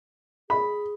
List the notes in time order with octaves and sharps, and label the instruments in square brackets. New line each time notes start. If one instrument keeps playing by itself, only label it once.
[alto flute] G#4 [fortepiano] B5